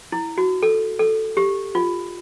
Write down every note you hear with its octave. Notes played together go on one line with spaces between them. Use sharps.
E4
F#4
A4
A4
G4
F4